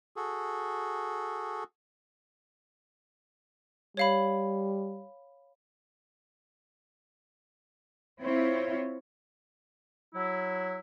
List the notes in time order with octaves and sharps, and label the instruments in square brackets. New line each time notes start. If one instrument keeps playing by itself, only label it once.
[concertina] F#4 G#4 A4
[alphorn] G3 [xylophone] C#5 F5 B5
[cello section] C4 E4 F4 C#5
[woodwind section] F#3 E4